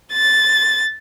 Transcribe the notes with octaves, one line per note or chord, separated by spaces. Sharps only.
A6